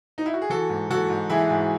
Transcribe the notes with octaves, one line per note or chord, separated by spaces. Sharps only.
D#4
E4
F#4
G#4
E3 F#4 A4
G#2
E3 F#4 A4
G#2
E3 E4 G#4
G#2